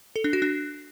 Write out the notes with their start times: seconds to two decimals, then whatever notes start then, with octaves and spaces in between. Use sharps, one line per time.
0.16 A4
0.24 D4
0.33 F#4
0.42 D4